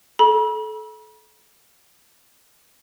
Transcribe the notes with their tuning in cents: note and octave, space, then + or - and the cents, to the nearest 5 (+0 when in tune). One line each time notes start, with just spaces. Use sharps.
A4 -25 B5 -45